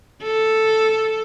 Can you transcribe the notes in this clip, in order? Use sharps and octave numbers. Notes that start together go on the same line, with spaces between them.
A4